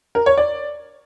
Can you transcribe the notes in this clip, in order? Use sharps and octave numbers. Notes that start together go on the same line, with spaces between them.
A#4
C#5
D5